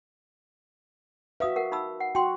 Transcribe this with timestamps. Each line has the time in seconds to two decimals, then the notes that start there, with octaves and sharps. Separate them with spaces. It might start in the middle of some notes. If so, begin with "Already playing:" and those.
1.40 F#4 B4 E5 F5 D#6
1.56 A#4 F#5
1.72 D#4 B5 E6
2.00 F#5
2.15 F#4 G5 C6